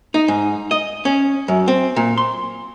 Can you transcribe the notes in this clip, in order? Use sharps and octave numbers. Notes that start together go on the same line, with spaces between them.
D#4
G#2
D#5
C#4
F#2
C4
A#2
C6